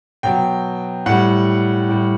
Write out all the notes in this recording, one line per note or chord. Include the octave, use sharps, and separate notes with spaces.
B2 F#3 G5
A2 G3 F#5
A2 G3